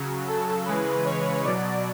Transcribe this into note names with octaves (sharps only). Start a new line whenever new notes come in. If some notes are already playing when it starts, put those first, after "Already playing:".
Already playing: C#3 F#3
A4
C#3 E3 G#3 B4
C#5
B2 F#3 D5